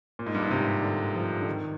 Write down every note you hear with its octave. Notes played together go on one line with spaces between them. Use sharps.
A#2
G#2
G2
G#2
C3
D3
F3
D3
D#3